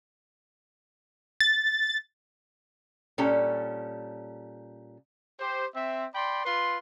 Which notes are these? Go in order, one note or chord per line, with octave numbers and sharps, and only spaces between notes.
A6
A#2 G3 C#4 A4
G4 C5
C4 E5
D5 G5 B5 C6
F4 B4 C6